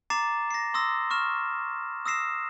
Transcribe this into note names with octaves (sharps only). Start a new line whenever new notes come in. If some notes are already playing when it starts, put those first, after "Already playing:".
A#5 D6 A6 C7 E7
A#6 C7
C6 D#6 E6 A#6
C#6 F6 E7
D#6 E6 A#6 C7 E7